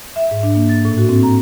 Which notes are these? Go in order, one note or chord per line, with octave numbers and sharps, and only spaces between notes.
E5
G#2
D4
A#3
A6
A2
F#4
C4
A#5